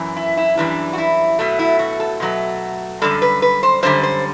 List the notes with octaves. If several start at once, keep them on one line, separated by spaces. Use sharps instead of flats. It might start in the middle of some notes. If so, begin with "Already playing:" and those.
Already playing: F#2 E3
E4
E4
F#2 E3 G3 D4
F#4
E4
B2 F#3 A3
E4
F#4
A4
B2 F#3 A3
F#2 D3 G3 A4
B4
B4
C5
F#2 D3 G3 C5
C5